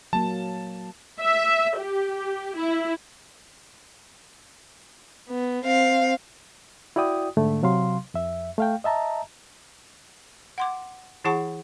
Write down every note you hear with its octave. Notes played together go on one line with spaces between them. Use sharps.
F#3 A#3 A5
E5
G4
E4
B3
C4 F5
E4 F#4 D5 G5 D#6
G#2 D3 A3
C3 F#3 F5 C6
F2 E5
A3 F5 G5
D#5 E5 A5 A#5
F#5 C6 D6
E3 E4 G#4 F#5 A5 C#6